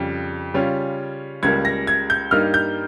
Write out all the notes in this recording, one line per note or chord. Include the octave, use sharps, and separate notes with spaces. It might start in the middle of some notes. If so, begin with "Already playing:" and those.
Already playing: F2 C#3 G3
C#3 G3 C#4 F4
C#2 C#3 G3 A#3 G#6
A#6
G#6
G6
G2 G3 A#3 D#4 F6
G6